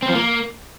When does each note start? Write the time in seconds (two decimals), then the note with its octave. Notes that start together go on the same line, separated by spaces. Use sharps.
0.02 C4
0.09 F3
0.15 A#3